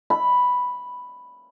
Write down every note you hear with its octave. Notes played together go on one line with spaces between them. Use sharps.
B5